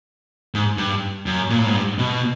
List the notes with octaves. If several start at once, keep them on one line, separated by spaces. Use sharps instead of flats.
G#2
G2
F#2
A#2
A2
G#2
G2
B2